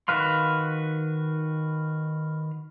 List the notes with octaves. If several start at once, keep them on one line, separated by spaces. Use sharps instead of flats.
D#3 F#4 B4 F5 C6